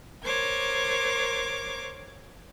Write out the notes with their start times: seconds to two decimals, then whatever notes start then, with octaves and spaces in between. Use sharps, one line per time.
0.23 A#4 C5 C#5 D6 G#6